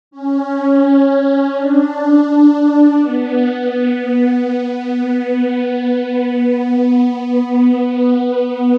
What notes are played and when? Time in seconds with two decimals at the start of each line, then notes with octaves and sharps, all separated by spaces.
0.11 C#4
1.54 D4
2.98 B3
5.85 B3